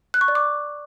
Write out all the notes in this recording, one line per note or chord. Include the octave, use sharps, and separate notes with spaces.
F#6
C#6
D5
D6